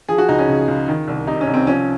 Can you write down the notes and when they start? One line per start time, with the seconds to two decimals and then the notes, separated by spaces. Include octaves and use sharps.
0.09 F3 G#4
0.18 F#4
0.29 C#2 D#4
0.39 C#4
0.48 C#3
0.68 C#2
0.88 D#3
1.08 C2
1.27 C3 D#4
1.41 C#4
1.47 C2
1.54 C4
1.67 F3 C#4